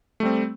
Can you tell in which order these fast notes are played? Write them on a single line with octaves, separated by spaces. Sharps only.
A3 G3 C4